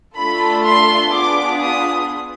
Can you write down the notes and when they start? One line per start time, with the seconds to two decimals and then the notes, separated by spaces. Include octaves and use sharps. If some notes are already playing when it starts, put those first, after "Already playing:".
0.17 A3 D4 F4 A4 B5
0.64 C6
1.11 B3 D4 F4 G#4 D6
1.59 D#6